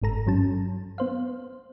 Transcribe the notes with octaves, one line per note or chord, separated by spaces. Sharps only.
G1 G#2 A4 A#5
G2 F#3 C#4 A5
B3 C5 F5